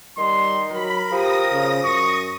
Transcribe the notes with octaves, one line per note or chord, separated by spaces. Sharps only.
D#3 G3 C6
F#3 A#4 B5
F3 G4 D#6 A#6
C#3
F#2 C#6